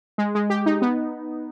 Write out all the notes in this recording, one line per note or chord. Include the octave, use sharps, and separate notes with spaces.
G#3
G#3
G4
D#4
B3